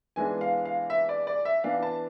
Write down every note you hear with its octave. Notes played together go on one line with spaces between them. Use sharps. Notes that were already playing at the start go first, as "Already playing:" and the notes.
E3 G#3 B3 D4 G#5
F5
F5
E5
D5
D5
E5
E3 B3 D4 F5
A5